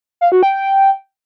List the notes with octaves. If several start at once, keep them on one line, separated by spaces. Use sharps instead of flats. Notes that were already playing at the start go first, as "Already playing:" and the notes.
F5
F#4
G5